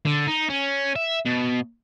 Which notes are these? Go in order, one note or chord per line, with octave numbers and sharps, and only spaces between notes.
D3
D#4
C#4
E5
B2